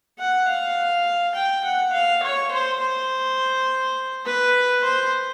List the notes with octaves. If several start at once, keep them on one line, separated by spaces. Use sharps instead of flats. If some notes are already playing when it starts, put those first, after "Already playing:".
F#5
F5
G5
F#5
F5
C#5
C5
C5
B4
C5